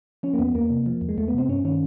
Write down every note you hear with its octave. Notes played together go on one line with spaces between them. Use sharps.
F3 C#4
A#3
E2 B3
E2 A#3
C3
F3
E2
G#3
E2 A3
B3
C3 C4
G2 C#4
D#3 C#4